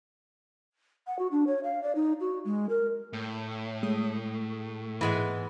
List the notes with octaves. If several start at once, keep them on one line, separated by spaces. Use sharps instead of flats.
F#5
F#4
D4
C#5
F5
D5
D#4
F#4
G#3
A#4
A2
G#3 A3 D#6
G#2 E3 G#3 B3